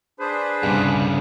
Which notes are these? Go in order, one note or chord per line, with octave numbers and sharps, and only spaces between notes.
D4 G#4 B4 C5
C2 G2 C#3